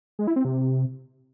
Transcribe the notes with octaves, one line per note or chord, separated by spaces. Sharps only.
G#3
E4
C4
C3